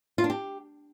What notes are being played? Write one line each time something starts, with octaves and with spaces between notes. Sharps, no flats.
F4
D4
G4